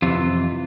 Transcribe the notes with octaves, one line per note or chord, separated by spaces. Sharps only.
F2 C3 E3 F4